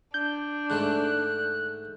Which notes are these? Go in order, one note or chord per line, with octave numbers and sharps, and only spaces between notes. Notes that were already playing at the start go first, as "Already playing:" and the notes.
D4 G6
G#2 D3 A3 F#6